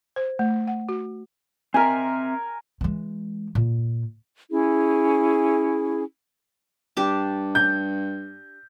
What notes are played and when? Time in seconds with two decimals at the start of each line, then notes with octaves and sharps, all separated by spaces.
0.16 C5
0.39 A3
0.67 F#5
0.89 F#4
1.74 C4 A#4 E5 G#5
2.81 E3 G#3
3.55 A#2
4.51 C#4 E4 G#4
6.97 G2 D4 G4 A5
7.55 G6